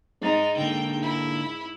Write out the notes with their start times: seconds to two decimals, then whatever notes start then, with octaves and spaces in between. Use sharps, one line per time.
0.21 G#2 G#3 D#4 A6
0.56 D3 A#3 G5
1.02 E4